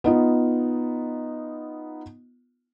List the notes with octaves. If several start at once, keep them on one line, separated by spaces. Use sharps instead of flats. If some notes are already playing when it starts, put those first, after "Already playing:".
B3 D#4 F4